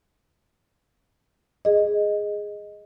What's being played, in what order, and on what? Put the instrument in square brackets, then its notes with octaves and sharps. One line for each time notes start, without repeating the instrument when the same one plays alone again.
[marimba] G#4 D#5